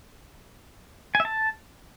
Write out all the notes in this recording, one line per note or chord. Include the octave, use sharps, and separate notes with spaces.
G#5
E5
A5